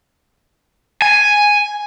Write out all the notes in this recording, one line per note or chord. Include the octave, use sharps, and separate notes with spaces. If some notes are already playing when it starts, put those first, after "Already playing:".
G#5